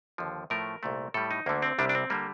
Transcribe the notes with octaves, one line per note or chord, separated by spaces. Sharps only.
D#2 D3 F3
A2 F3 A3 A#4
C2 A#2 A3
A2 G3 A4
D#4
D2 D3 A3 A#3
C4
C2 C3 G3 D4
D4
C4
D3 G3 A#3